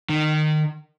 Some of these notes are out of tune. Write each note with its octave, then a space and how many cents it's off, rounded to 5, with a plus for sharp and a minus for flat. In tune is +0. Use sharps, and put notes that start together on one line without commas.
D#3 -25